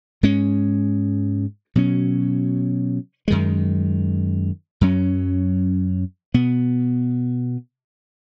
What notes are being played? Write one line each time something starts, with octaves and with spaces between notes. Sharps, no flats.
G#2 G#3 C#4
B2 F#3 C#4
F#2 D#3 G#3
F#2 F#3 C#4
B2 B3